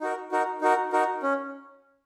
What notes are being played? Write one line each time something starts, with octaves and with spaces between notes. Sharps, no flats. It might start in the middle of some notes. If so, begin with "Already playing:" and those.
D#4 F#4 A#4
D#4 F#4 A#4
D#4 F#4 A#4
D#4 F#4 A#4
C#4